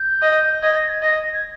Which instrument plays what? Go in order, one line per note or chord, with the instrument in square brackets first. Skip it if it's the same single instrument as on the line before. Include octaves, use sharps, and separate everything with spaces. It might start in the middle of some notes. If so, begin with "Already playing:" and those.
Already playing: [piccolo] G6
[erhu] D#5
[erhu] D#5 [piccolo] G#6
[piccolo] A#6
G#6
[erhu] D#5 [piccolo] A#6
[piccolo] A#6
G#6